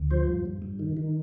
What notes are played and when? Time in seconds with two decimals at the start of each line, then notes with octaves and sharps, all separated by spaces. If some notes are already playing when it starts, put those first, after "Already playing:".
Already playing: D2
0.11 F3 C5
0.28 G2
0.45 G2
0.62 G2
0.79 D#3
0.97 D#3